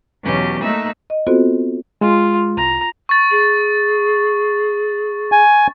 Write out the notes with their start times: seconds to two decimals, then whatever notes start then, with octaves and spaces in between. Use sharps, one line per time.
0.21 E2 B2 F#3 C#4 G4
0.62 A3 A#3 D#4 E5 E6 F#6
1.10 D#5
1.27 B3 C4 F4 F#4 A4 C5
2.01 G#3 F4
2.57 C2 A#5
3.09 C#6 A6
3.31 G#4
5.32 G#5